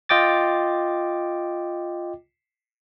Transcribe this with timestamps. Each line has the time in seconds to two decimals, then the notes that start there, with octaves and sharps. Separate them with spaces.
0.09 F4 D#5 G5 D6 A6